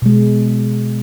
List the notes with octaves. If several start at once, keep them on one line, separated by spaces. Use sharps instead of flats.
B2 G#3